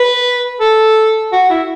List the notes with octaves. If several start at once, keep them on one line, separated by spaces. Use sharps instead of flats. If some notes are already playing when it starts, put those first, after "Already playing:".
Already playing: B4
A4
F#4
E4